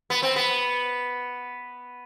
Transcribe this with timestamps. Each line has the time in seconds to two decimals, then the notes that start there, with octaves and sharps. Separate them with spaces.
0.10 B3
0.22 C4
0.36 B3